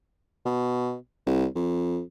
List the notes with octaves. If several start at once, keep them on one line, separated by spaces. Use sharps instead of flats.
B2
C2
F2